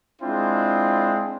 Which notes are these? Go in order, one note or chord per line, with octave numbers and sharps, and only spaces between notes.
G#3 C4 D4 E4 F4